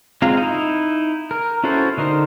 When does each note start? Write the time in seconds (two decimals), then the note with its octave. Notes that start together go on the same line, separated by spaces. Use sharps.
0.22 G#3 C4 F4 F5 A#5
0.37 D#4 E4
1.31 A#4
1.64 C#4 E4 F#4 A4 C5
1.98 D3 D#4 A#4 C5